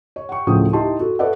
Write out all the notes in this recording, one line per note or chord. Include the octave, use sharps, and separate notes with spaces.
C#5
F#5 G5 C#6
D2 A2 C#3 F3 G5 D#6
D#4 E4 G4 A5 C6
F#4 A4
A4 B4 C#5 D5 E5 F#5